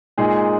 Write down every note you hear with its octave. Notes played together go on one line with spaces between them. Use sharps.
A#2 G#3 D#4 G#4